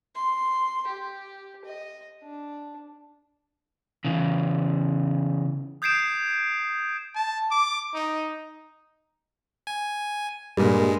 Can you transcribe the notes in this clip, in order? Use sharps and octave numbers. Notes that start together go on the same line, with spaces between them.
C6
G4
D#5
D4
C#3 E3
D#6 G6 G#6 C7 D7 E7
A5
D6
D#4
G#5
G2 A#2 G3 G#3